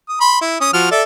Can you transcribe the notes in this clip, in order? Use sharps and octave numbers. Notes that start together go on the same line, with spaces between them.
D#6
B5 C6
E4
C#4 D#6
F3 F#4 F6
A4 D5 E5